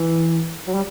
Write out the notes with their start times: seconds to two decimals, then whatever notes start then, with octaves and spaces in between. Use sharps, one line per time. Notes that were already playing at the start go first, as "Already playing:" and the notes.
Already playing: E3
0.67 F#3
0.74 G3